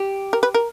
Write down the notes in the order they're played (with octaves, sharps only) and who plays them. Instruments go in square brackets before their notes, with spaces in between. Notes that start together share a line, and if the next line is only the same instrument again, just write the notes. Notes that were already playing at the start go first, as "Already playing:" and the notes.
Already playing: [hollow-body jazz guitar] G4
[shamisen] A#4
B4
A#4